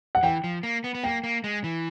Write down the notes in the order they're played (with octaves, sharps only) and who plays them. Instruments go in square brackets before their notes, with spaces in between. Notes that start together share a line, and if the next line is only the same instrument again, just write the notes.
[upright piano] F#5
[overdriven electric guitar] E3 [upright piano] G5
[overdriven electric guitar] F3
A#3
B3
B3
[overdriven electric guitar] A#3 [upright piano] G5
[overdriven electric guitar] A#3
G#3
E3